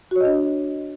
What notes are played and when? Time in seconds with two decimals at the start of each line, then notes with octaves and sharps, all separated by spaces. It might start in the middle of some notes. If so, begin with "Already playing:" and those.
0.11 F#4
0.16 C#5
0.20 D#5
0.25 D4